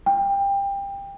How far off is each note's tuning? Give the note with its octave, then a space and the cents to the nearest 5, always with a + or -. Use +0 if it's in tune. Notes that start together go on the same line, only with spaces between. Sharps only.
G5 +25